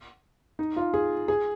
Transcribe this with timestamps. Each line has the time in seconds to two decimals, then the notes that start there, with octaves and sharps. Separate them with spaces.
0.59 D#4
0.76 F4
0.94 G#4
1.28 G#4